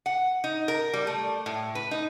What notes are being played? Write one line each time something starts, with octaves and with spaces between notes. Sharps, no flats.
F#5
D#4
A#4
G3
A3
A2
B4
D#4